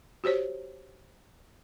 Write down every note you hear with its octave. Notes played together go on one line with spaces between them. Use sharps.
F#4 G4 C5 C#5